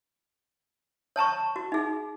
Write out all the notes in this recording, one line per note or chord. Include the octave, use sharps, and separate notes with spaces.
C#5 A5 A#5 C#6
F#4
D#4 G#4